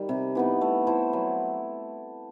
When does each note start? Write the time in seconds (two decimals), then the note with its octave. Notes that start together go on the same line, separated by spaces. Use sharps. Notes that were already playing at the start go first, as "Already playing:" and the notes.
Already playing: D#3 G3
0.09 C3
0.35 E3 B3 D#4
0.61 A3
0.87 E4 A4 C5
1.13 F#3